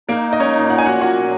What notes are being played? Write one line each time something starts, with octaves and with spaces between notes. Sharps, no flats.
A#3 D#4 A#4
D#5
C#4 C#5
A#2
F#5
G#5
F#4 F#5
F#3 F#4 F#5